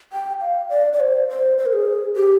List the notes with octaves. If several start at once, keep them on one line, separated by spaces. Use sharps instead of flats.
G5
F5
D5
D5
C5
C5
C5
A#4
G#4
G4